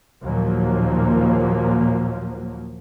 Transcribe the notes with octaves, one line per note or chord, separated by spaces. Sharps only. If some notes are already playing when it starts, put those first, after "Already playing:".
D#2 A#2 F3 F#3 A#3